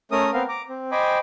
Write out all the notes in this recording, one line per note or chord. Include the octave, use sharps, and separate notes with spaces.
A3 C#4 A#4 D#6
B3 C4 A#4 F5
A#5 D6
C4
C5 D#5 G5 G#5 B5 D6